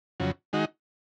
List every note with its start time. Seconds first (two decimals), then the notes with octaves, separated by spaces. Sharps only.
0.20 F2 C#3 F#3
0.53 D#3 G#3 D#4 F#4